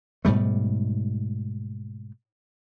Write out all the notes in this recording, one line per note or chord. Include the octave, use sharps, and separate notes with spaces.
G#2 B2 G3 A3